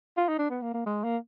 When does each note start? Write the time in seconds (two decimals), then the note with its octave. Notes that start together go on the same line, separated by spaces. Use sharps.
0.17 F4
0.28 D#4
0.39 D4
0.50 B3
0.61 A#3
0.74 A#3
0.86 G#3
1.04 A#3